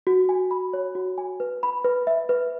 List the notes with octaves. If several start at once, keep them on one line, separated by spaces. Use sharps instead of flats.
F#4
G#5
B5
C#5
F#4
G#5
B4
B5
B4
E5
B4